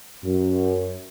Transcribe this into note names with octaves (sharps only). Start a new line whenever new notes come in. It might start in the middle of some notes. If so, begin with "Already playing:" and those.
F#2